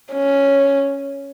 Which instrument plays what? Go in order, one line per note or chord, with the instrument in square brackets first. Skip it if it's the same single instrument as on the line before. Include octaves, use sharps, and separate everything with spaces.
[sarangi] C#4